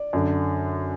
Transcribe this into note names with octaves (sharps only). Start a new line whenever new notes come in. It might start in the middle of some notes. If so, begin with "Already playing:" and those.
Already playing: D5
F#2 D3